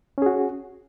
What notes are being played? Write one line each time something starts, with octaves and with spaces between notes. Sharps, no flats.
C#4 F#4 G#4